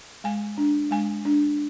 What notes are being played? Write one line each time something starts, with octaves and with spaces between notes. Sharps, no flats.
G#3 G#5
D4
G#3 G#5
D4